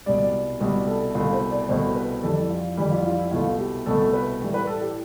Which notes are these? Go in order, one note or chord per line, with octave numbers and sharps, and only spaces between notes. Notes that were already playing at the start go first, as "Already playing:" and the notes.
C2 B2 G3 D5
C2 B2 G3
A4
C2 B2 A3 F4
C5
D5
C2 B2 A3 C5
B4
F2 E3 G3 A4
F4
F2 E3 G3 E4
F4
F4
E4
C2 B2 A3 F4
G4
C2 B2 A3 A4
B4
A2 E3 G3
B4
A4
G4